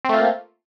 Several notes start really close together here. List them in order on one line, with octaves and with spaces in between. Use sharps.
C4 A3 F4 A#3